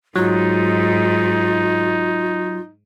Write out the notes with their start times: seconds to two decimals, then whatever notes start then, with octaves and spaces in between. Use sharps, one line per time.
0.16 G#2 F#3 D#4 F4